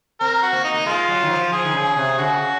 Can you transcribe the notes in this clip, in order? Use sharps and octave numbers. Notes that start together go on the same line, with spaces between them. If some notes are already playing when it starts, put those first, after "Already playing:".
C4 A#4
F#4
A#3
D#4
A#3
G#3 F4
F#3
D#3
F3
F3 G#4
D#3
C#3
C3
C#3 F#4
C#3